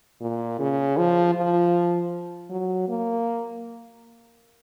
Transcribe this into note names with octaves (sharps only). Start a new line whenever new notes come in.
A#2
C#3
F3
F3
F#3
A#3